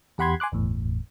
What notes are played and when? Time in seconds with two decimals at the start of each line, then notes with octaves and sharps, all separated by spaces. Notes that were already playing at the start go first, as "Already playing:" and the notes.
0.18 E2 G4 F#5 B5 C6 G#6
0.40 G#5 C6 D6 F#6
0.52 G1 E2 A2